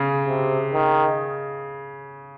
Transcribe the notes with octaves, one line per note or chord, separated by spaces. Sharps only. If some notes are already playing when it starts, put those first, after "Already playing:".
Already playing: C#3
C3
D#3